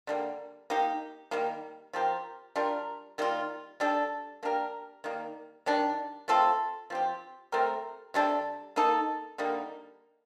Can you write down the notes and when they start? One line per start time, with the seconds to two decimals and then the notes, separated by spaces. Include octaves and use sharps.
0.07 D3 G3 A#3
0.70 A#3 D#4 G4
1.31 D#3 G3 A#3
1.93 F3 C4 G4 A#4
2.56 G3 D4 F4 A#4
3.18 D#3 G3 A#3 F4
3.80 G3 D4 A4
4.43 A#3 D4 G4 A#4
5.04 D#3 G3 A#3
5.66 D#3 G3 D4
6.28 A3 C4 F4 A4
6.90 F3 C4 G4
7.52 A3 C4 G4 A#4
8.14 C3 G3 D4 A4
8.76 A#3 D#4 A4
9.38 D3 G3 A#3 D#4